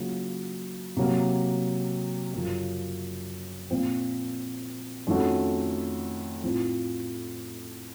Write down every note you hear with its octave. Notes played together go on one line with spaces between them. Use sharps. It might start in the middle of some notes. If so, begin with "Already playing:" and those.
Already playing: C#3 F#3 A#3 F4
C3 F#3 A#3
F#2 C#3 F3
A#2 F3 C4
F2 D#3 A3 C#4 F#4
A2 F3 C4 F4